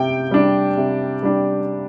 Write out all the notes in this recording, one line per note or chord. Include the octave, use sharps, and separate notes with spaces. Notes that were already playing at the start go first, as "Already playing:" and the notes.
Already playing: C3 G5
G3 D4
C3
G3 D4